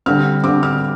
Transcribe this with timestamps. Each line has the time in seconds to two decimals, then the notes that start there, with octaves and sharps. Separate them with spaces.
0.06 D3 G3 C4 F6
0.44 D3 G3 C4 D6
0.63 F6